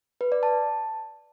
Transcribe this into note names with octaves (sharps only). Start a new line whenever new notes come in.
B4
D5
A5